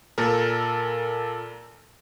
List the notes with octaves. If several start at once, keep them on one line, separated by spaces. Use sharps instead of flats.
A#2 A4 A#4